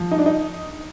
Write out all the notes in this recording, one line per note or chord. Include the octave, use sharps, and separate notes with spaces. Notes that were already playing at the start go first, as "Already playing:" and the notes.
Already playing: F3
D#4
D4
D#4